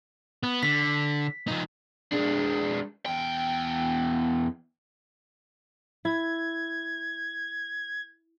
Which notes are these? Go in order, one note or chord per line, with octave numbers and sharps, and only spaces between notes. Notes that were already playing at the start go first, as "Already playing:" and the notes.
B3
D3 B6
F3 D#4
G#3 D4
E2 G5
E4 G#6